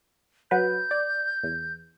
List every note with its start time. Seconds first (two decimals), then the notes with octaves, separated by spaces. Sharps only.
0.51 F#3 B4 G6
0.91 D5
1.44 E2